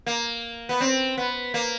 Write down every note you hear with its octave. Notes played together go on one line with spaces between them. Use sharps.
A#3
B3
C4
B3
A#3